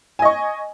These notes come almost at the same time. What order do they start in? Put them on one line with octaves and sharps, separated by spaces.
G#5 D#5 C#6